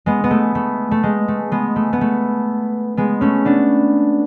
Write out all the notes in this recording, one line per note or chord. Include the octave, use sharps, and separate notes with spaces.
G#3 B3
B3
A3
A3
A3
G#3
A3
G#3 B3
A3
B3
A3
G#3 B3
A3 C#4
B3 D4